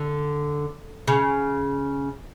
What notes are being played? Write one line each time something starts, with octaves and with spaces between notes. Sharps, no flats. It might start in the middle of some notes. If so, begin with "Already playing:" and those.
Already playing: D3
C#3